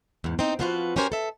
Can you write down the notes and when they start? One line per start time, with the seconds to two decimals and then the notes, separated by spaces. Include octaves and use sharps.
0.24 E2 G#2
0.39 C4 D#4
0.59 F3 B3 C4 F4 F#4 B4
0.96 F#2 C#4 G4 A#4 C5 G#5
1.12 A4 E5